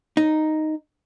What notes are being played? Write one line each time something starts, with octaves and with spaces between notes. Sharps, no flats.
D#4